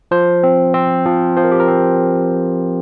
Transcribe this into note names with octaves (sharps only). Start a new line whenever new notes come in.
F3 C5
C4
C4
F3
F3 C5
A#4
G4
A#4
C4